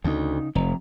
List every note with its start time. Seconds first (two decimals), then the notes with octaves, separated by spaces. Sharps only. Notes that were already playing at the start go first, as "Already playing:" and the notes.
0.04 D2 C#3 D#4
0.55 F1 F2 A#5